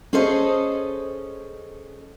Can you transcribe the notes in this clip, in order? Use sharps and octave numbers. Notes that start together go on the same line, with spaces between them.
C#4 G#4 A4 C5 D#5